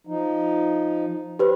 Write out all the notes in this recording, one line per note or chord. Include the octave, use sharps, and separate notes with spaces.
F3 D#4
G4 B4 C5